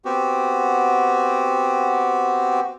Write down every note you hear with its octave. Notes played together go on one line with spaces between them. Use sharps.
B3 C4 F#4 G4